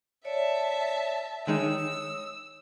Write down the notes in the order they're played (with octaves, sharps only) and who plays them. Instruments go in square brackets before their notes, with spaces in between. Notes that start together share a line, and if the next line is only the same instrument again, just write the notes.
[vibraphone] C#5 D5 [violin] E5 A5
[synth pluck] D#3 G#3 D#4 [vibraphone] C#5 D#6 [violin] E6